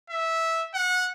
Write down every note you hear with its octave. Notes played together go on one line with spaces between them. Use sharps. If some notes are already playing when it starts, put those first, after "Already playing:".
E5
F#5